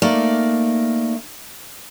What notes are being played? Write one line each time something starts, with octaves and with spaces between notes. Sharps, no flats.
A3 A#3 D#4 D5